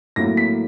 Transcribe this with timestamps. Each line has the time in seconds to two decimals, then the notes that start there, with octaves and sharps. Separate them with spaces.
0.16 A2 F#3 A#3 A#6
0.37 B6